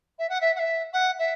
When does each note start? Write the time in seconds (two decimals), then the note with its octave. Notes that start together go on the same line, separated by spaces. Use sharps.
0.19 E5
0.29 F#5
0.41 E5
0.56 F#5
0.59 E5
0.93 F#5
1.19 E5